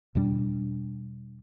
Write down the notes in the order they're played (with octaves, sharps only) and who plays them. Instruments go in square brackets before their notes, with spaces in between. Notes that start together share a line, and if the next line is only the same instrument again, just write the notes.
[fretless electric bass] E2 B2 G3 D4